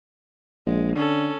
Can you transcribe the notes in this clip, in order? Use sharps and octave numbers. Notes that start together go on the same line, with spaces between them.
A#1 G#3
D3 C#4 A4